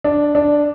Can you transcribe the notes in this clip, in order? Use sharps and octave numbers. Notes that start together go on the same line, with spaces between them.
D4
D4